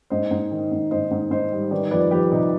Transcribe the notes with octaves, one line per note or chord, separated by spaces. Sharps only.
G#2 C5 D#5
G#2
D#3
G#2
G#2 C5 D#5
G#2
G#2 C5 D#5
G3
D#3 B4 D5
F2 B4 D5
F2 G4 B4
C3 D#4 G4